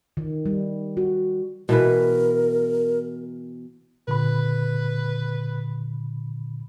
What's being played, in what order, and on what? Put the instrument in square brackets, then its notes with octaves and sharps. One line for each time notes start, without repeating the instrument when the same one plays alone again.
[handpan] D#3
G3
F#4
[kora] B2 E3 B4 [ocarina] A#4
[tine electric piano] A#2 D3 B5 [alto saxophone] B4